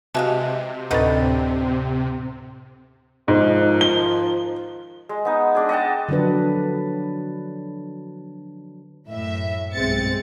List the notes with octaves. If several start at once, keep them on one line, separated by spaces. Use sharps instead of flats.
C3 E3 G#3 F#4 E5 F5 A5
D2 A2 D3 C4 D#4 B4 A6
G#2 D#3 F3
G7
G#3
B3 D#4
G#3 D4 G#4
D#5 F#5 G5 A5
D3 F3 F#3 D4 B4
F#2 A2 E5
B1 G2 G#3 C4 A6 C#7